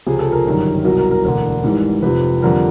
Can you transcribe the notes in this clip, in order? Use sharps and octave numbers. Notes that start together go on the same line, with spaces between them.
C#2 C3 F3 G#4
A4
A#4
G1 F#2 D#3 G3
C2 B2 F#3 A#4
A#4
A#4
E1 D2 D3 A#4
G#1 G#2 E3 G3
F1 F2 C3 F3 B4
F2 D3 G3 A#4